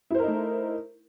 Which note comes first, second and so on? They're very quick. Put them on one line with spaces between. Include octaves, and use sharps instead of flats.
E4 C5 A#4 D#4 A3